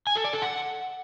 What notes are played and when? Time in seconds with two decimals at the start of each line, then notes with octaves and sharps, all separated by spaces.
0.07 G#5
0.16 A4
0.24 D5
0.33 A4
0.42 F#5